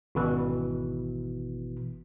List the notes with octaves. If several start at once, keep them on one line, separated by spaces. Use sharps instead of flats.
G#1 B2 E3